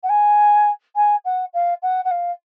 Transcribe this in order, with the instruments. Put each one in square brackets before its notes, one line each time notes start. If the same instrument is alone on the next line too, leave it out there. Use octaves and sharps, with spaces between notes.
[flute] F#5
G#5
G#5
F#5
F5
F#5
F#5
F5